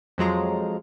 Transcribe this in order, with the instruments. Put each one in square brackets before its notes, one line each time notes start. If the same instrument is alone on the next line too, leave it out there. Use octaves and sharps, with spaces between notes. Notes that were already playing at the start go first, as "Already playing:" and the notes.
[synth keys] F2 F3 F#3 G#3 F4 A#5